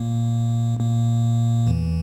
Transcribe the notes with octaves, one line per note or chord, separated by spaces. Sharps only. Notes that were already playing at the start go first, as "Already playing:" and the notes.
Already playing: A#2 A#3
A#2 A#3
E2 E3